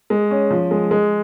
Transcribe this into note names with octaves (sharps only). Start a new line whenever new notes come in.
G#3
C#4
F3
G#3
G#3